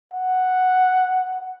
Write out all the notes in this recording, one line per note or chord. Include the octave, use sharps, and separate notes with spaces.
F#5